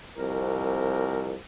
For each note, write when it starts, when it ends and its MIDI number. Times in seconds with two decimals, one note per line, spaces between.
0.17 1.33 36
0.17 1.33 41
0.17 1.33 70